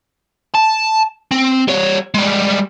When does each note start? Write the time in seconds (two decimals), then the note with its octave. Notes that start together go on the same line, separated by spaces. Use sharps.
0.55 A5
1.31 C4
1.68 G3 C#5
2.14 G3 G#3